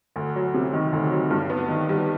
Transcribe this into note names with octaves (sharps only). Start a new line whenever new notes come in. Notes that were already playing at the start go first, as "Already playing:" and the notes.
D2
F#3
C3
D#3
D2
F#3
G2
B3
D#3
G3